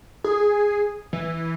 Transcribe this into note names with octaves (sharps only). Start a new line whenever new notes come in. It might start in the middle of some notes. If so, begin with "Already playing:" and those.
G#4
E3